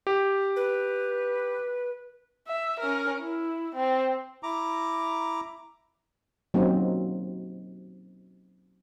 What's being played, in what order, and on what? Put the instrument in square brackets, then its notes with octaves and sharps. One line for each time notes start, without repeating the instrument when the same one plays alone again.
[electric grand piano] G4
[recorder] B4
[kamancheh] E5
C#4 A#4
E4
C4
[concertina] E4 A#5 D6
[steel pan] F#3 A#3 C4 C#4 D#4